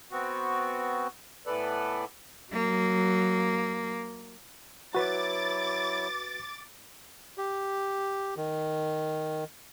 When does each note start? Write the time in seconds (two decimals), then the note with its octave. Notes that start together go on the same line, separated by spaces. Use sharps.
0.11 B3 C4 F#4
1.46 A2 E3 B3 A4 B4 D5
2.53 F#3 A#3
4.95 F#3 E4 F#4 B4 D6 A6
7.38 G4
8.37 D#3